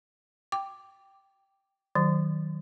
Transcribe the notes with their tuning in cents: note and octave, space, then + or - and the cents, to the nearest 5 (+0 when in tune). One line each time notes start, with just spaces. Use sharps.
G5 +0 D6 +0
D#3 +0 F#3 +0